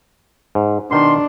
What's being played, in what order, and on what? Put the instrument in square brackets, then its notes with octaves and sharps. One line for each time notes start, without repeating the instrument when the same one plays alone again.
[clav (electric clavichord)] G#2
[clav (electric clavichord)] B2 D#3 [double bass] D4 [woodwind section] C6